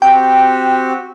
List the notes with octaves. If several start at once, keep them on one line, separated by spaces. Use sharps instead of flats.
C4 F#4 G4 G5